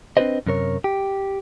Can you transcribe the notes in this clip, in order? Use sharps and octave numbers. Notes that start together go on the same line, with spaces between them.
C4 D4 F4 B4 C5 D#5
F#2 C3 A#4 C#5
G4